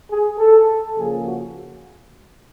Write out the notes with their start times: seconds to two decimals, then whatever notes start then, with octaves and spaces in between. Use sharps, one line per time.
0.10 G#4
0.39 A4
0.97 C#3 F3 A#3 G#4
1.26 F#4